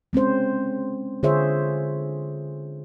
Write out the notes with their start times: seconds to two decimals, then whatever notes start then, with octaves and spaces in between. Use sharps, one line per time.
0.13 G#3 C4 C#4 C5
1.23 D3 F4 G#4 C5 C#5 E5